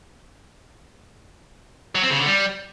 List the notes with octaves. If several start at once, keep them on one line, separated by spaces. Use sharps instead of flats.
F#3
C4
C#3
D3
G3